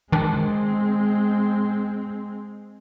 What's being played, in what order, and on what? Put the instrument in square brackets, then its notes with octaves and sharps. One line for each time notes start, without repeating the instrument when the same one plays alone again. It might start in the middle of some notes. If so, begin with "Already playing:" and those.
[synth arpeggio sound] D#3 D4 [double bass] G#3 C4